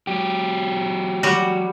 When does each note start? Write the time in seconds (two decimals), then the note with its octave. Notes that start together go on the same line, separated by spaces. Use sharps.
0.07 F#3 G4
1.23 G3 F#4